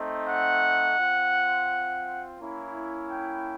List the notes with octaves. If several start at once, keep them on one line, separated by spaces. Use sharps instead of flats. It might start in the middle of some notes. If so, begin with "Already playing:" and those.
Already playing: A3 C4 D#4
F#5
C4 F4
A#3 C#4 E4
G5